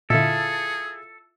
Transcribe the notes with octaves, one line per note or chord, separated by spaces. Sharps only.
A#2 D3 E4 F4 G#4 A4 E5